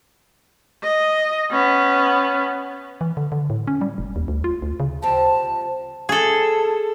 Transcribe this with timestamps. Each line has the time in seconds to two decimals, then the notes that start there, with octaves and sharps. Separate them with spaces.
0.83 D#5
1.51 B3 C#4
3.01 E3
3.17 D3
3.32 D3
3.50 A2
3.67 C#4
3.81 G3
3.98 F1
4.16 D#2
4.28 D2
4.44 F4
4.62 D2
4.80 C#3
5.02 F3 G3 C4 A5
6.09 G#4 A4